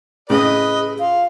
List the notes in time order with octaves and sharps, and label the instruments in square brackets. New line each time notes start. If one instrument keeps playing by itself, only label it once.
[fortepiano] A2 C#3 [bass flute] G#4 [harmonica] B4 D#5
[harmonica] F4 [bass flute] F5